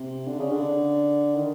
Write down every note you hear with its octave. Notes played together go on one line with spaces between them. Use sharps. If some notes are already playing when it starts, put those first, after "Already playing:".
Already playing: C3
D3
C#3
D3
D#3